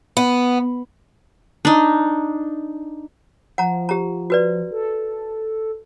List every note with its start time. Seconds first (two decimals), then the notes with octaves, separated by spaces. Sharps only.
0.17 B3
1.65 D4 D#4
3.58 F3 F#5 A#5
3.89 G4 A#5
4.30 F#4 B4 D5
4.71 A4